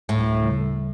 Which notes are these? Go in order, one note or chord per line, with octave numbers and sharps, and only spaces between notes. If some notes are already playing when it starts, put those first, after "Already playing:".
D2 A2
C#3 G3